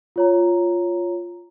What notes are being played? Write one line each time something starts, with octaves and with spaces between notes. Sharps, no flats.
F4 C#5 A#5